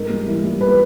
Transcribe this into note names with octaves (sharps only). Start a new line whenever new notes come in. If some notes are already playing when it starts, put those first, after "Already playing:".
Already playing: G#2 A#4
G3
E3
G3
B4